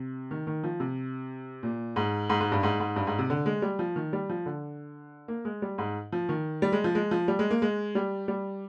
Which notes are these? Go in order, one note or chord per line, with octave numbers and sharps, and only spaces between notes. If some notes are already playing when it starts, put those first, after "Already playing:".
Already playing: C3
D#3
D#3
F3
C3
A#2
G#2
G#2
G#2
G2
G#2
G#2
G2
G#2
C3
D3
G#3
G3
F3
D#3
G3
F3
D3
A#3
G#3
G3
G#2
F3
D#3
G3
G#3
F3
G#3
F3
G3
G#3
A#3
G#3
G3
G3